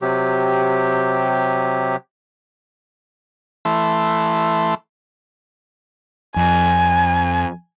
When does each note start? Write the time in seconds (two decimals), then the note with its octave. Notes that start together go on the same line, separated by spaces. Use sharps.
0.02 C3 F#3 G4
3.65 E3 A3 C6
6.36 F2 G#5